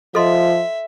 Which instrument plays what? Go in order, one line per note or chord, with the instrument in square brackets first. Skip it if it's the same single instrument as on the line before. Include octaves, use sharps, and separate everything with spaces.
[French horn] F3 [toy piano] A4 D#5 C6 [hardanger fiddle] E5